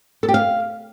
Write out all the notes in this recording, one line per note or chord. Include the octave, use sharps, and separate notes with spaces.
A4
G4
F5